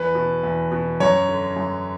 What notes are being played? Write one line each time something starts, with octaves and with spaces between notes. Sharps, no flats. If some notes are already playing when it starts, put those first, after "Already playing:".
Already playing: E2 B4
B2
E2
B2
F#2 C#5
D3
F#2